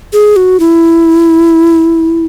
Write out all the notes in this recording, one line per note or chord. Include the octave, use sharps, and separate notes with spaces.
G#4
F#4
E4